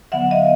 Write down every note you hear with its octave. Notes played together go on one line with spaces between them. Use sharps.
D3 F#3 B3 E5 F#5
D#5 F5